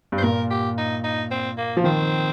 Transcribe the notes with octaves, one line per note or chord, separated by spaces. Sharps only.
G2
C5
A#2 A#4
G4
D#4
D#4
C4
A#3
F3
D#3 C4